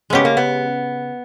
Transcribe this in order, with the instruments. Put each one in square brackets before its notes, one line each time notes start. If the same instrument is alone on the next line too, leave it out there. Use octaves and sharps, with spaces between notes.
[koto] C#3 G#3 C#4 G4 [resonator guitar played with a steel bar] B3
[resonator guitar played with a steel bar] A#3
B3